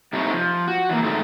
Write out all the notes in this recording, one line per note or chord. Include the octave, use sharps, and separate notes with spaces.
C3 G3 A3 D#4 C5 C#5
F3
F#4
E3 A#3
A2 D#3 G#3 A3